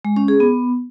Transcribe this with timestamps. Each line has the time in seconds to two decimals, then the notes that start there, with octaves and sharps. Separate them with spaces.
0.05 G#3
0.16 C#4
0.28 G#4
0.40 B3